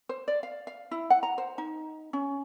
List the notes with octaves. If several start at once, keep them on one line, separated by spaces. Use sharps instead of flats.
C5
D5
F5
F5
E4
F#5
A#5
C5
D#4
C#4